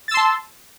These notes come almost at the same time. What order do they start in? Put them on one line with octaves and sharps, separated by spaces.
A6 E6 C6 A5